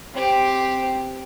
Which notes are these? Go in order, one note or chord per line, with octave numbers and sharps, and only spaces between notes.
C4 G4